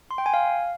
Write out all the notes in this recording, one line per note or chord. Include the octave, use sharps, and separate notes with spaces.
C6
G5
G#5
F5